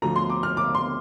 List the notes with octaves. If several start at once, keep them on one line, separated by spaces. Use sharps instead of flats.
D2 D3 F3 A#5
C6
D6
F6
D6
C6